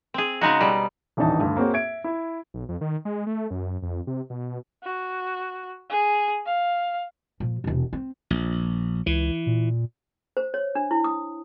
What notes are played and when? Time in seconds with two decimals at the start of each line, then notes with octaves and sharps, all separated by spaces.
0.14 C4 G#4
0.41 C#3 G#3 D#4 F#4
0.60 B2 G3
1.17 D#1 A1 E3 D4 D#4 A5
1.40 D2 G2
1.57 A#3 C4 F#4 G#4 C#5
1.73 E5 G#6 D7
2.04 E4
2.54 B1
2.69 F2
2.81 D#3
3.05 G#3
3.26 A3
3.51 F#2
3.82 F2
4.07 C3
4.30 B2
4.83 F#4
5.90 G#4
6.46 F5
7.40 A#2 F3
7.64 E1 C3
7.93 C4
8.31 A#1
9.06 C#2 E3
9.46 A#2
10.37 C5
10.54 C#5
10.75 D4
10.91 E4
11.04 D#6